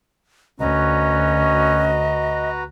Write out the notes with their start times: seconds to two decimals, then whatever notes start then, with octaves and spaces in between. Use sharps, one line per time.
0.60 D2 C#4 F#4 B4 D#5 A#5